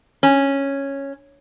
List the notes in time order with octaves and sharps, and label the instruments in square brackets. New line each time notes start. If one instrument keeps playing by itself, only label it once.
[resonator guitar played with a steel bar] C#4